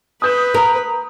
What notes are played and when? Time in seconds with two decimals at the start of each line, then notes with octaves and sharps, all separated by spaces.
0.22 B4 D#6 G6 E7
0.54 A#4